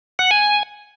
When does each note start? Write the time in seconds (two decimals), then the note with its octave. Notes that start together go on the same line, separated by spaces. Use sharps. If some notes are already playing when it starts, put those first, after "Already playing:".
0.19 F#5
0.31 G#5